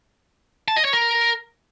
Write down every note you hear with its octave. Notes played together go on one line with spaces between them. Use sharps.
A5
D#5
C#5
A#4